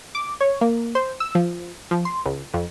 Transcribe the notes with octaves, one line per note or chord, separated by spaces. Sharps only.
D6
C#5
A#3
C5
E6
F3
F3
C6
C#2
F2